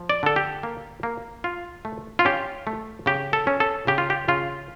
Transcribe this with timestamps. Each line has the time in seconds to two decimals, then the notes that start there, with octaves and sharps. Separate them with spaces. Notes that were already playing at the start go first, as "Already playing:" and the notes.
Already playing: F3
0.09 D5
0.23 D3 A4
0.36 G4
0.63 A#3
1.03 A#3
1.44 F4
1.85 A3
2.19 F4
2.25 C#4 G4
2.67 A3
3.06 C#3 G4
3.33 A4
3.47 C#4
3.60 A4
3.87 C#3 G4
3.98 F4
4.10 G4
4.28 C#3 F4